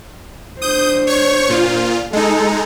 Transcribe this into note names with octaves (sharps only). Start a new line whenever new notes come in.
D4 C5 D#6 G6
C#5 C#6
A#2 F4
G#3 D#4 A4